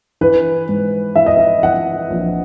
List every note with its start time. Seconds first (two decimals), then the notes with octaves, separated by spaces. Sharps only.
0.21 E3 B4
0.69 G#2
1.16 E3 E5
1.26 D#5
1.37 E5
1.63 E3 F#5
2.10 A#1